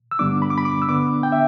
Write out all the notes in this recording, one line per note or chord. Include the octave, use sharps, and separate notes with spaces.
E6
G2 D3 G3 B3 D4 D6
B5
D6
B5
D6
E6
D3 B3 D4 D6
G5
E5